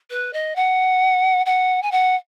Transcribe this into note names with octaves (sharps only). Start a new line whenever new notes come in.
B4
D#5
F#5
F#5
G#5
F#5